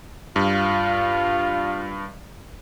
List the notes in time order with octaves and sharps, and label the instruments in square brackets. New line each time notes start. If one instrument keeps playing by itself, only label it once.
[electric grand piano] G2 [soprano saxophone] F4